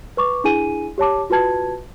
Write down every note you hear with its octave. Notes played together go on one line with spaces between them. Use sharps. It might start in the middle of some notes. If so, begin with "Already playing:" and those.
B4 C#6 D6
D4 E4 G#4 G#5 D#7
G4 C#5 A5 D6
F4 F#4 B4 A5 G#6